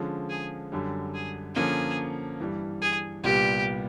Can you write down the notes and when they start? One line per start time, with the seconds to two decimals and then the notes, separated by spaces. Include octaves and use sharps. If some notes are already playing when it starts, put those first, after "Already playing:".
Already playing: D3 F3 G#3 C#4
0.30 G#4
0.72 F#2 D3 G3
1.14 G#4
1.55 D3 F3 A#3 C#4 G#4
2.40 G2 E3 G3
2.82 G#4
3.24 C2 A#2 G3 B3 G4